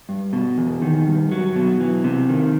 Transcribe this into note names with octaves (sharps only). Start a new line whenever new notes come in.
G2
B2
E2
D#3
G2
F#3
B2
E3
C3
D#3